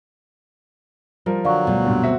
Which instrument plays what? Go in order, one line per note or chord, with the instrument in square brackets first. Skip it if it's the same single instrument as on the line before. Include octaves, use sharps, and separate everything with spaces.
[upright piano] F3 A#4 [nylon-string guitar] G3
[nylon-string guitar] D3 [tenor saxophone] F#3 [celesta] D5 F5 C#6
[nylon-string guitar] D2 B2 G3
[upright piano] G2 A#2
C4 F#4 E5